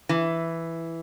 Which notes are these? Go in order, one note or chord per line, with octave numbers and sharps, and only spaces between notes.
E3